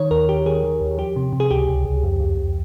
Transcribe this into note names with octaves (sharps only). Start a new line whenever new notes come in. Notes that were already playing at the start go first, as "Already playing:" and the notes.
Already playing: D#3 C#5
D#2 A#4
D#2 G4
D#3 G#4
D#3
D#2
F3 G4
C3
C3
G#4
C#2 G4
C#2
C#2
F2
F2
F2